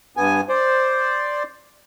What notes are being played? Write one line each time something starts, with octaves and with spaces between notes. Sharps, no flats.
G2 B3 G#5
C5 D5